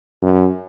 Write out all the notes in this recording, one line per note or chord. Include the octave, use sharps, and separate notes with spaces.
F#2